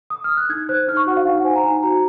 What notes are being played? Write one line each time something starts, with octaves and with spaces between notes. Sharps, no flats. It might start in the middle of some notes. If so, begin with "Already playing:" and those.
D#6
F6
F#6
D#4 G#6
C5 F#6
D#4 F6
C#6
F#4 F#5
F5
D#4 F#5
F#5
C5 G#5
A#5
D#4 G#5
F#4 A#5